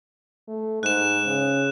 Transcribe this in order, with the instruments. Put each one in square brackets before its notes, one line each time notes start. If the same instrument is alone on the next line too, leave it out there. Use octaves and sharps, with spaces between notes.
[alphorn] A3
[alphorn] G#2 [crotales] F#6 E7
[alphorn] C#3